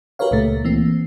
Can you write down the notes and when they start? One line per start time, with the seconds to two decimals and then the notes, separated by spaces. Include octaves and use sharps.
0.19 F#4 G4 A#4 B4 C#5 F5
0.31 C#2 A#2 A3
0.65 E3 A#3 C4